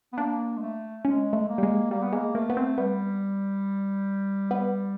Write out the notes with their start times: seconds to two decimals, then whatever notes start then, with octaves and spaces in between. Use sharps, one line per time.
0.13 B3
0.18 A#3 D4
0.57 G#3
0.62 A3
1.05 G#3 C#4
1.33 A3
1.48 A#3
1.58 G3
1.63 G#3
1.91 G3 A#3
2.03 B3
2.13 G#3 A#3
2.35 A3 A#3
2.50 B3
2.57 C4
2.78 G3 B3
4.51 B3